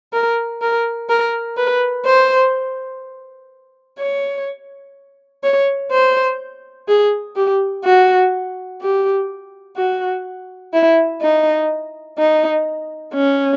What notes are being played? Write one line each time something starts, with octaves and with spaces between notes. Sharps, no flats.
A#4
A#4
A#4
B4
C5
C#5
C#5
C5
G#4
G4
F#4
G4
F#4
E4
D#4
D#4
C#4